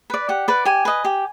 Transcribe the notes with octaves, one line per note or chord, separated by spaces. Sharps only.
B4 D5
G4 F#5
B4 D5
G4 G#5
B4 D#5
G4